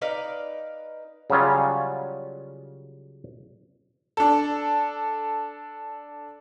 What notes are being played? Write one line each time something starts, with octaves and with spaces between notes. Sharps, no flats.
D#4 B4 D5 F5
C#3 F#3 G3 C#4 F4
D4 A4